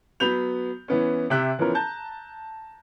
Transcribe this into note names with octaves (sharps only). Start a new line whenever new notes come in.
F#3 B3 B5 G6 F7
E3 B3 C#4
C3 G4 E5 F#6
E3 F3 B3 C#4 A#4
A5 A#5 G6